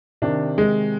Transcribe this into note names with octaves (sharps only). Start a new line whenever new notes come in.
C3 D#3 D4
G#3